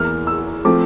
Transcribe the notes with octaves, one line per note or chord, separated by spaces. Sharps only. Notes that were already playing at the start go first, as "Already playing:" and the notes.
Already playing: E2 E3 A#3 F6
E6
F3 A3 C4 D6